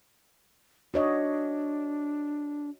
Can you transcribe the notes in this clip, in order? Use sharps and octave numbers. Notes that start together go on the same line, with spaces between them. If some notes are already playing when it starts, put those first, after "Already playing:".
D4 F#4 C#5 D#5